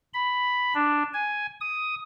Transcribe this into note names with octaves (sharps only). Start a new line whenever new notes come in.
B5
D4
G#5
D#6